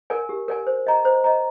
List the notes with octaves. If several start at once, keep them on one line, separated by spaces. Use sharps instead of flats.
A#4 D5 G#5
G4
A#4 D5 G#5
C5
D#5 A#5
C5
D#5 A#5